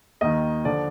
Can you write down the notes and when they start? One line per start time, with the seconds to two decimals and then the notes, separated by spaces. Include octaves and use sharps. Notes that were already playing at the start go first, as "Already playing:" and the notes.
0.21 D#2 D#3 D#5
0.64 D3 F3 D5